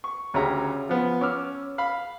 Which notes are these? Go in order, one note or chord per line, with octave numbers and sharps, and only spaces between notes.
C#6
D2 C#3 C#4 G4 E5 A#5
F3 B3
C#4 D6 E6 F6
F5 B5